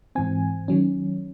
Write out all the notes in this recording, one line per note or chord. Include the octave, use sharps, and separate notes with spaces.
G#2 E3 C4 G#5
D#3 F#3 C#4